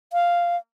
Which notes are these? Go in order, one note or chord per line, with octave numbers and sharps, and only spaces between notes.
F5